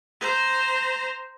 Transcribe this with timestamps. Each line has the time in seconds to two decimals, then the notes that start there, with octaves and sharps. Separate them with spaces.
0.21 C5 A#5